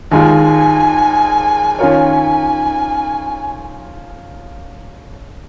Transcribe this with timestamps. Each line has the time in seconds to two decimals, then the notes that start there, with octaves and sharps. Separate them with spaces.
0.12 D#2 D#3 G#3 F4 G#5
1.79 D#3 C#4 F4 A#4 C#5 G#5